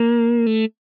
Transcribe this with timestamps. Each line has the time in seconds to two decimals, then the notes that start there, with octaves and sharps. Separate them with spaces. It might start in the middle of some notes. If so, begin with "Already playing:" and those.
Already playing: A#3
0.46 A3